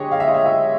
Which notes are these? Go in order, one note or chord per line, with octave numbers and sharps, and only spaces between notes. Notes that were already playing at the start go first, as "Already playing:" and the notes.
Already playing: D3 G#3 G4 G#4 C#5 D#5
F5
E5
D#5
E5
E5